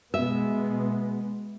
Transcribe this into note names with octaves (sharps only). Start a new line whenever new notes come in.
B2 G#3 B3 E5